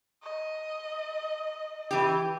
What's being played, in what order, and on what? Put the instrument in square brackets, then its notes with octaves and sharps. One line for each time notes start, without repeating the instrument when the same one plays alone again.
[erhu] D#5
[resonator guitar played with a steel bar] E3 G4